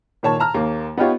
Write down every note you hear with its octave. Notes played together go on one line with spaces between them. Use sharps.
A#2 D#3 C#5 A5
A5 A#5 F6
D#2 A#3
B3 D#4 F4 G4 C#5